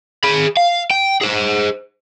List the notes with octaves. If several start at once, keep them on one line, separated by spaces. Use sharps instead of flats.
G#4 B5
F5
G5
G#4 C5